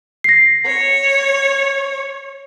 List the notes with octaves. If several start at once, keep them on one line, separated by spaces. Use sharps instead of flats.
A#6 C7
C#5